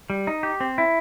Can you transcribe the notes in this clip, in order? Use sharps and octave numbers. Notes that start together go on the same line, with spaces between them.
G3
D#4
G4
C4
E4